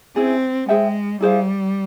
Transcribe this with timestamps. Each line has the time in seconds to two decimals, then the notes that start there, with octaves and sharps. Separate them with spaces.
0.16 C4 C#4 E4 G#4
0.69 G#3 G#4 C5 E5 G5
1.21 G3 E4 G#4 C5 F5